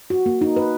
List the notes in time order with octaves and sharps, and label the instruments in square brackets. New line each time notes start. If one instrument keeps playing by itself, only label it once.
[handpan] F#4
A#3
D#4
B4